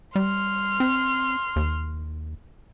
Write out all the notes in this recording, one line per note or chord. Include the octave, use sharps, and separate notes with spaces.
G3 C6 F6
C4
D#2